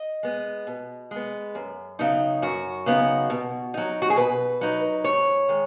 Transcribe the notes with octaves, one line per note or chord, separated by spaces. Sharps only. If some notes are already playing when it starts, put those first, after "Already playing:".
Already playing: D#5
G#3 B3
B2
G#3 B3
F#2
C#3 F#3 B3 D#4
F#2 F#4
C#3 F#3 B3 D#4
B2
F#3 D#4
F#4
G#4
B2 B4
F#3 D#4
G#2 C#5
D#3 G#3